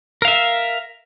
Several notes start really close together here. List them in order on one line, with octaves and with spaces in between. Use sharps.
A#4 F5 E5